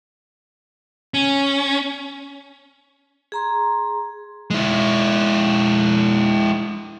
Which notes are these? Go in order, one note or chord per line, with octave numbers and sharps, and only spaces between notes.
C#4
G#4 A#5 C6
G#3 E4